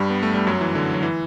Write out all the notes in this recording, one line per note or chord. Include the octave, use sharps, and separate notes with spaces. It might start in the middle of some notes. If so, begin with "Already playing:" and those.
Already playing: G2 G3
B3
A3
G3
F#2 F#3
E3
D3
F#3
E3